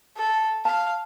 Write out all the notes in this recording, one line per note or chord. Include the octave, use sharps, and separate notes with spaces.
A4
F5 A5